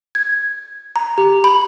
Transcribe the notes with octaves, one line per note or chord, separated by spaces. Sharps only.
G#6
A#5
G4
B5